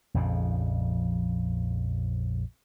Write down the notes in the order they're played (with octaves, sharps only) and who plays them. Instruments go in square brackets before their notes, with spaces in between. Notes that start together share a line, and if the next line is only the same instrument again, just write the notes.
[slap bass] A#1 F2 C#3 F3